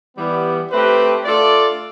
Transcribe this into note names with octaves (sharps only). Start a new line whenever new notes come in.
E3 G3 B3
A3 C4 G4 B4
A3 D4 F4 A4 D5